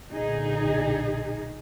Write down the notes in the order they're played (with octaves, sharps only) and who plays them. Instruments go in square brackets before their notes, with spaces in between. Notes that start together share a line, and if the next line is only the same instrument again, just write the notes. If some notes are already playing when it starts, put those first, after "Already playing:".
[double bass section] B1 A#2 D3 [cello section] D#4 G#4